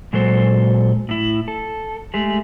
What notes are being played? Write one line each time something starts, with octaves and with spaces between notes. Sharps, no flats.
A#2 F#3 G#3 F#4 A4 C5
A2 E4
A4
G#3 A3 G4 G#4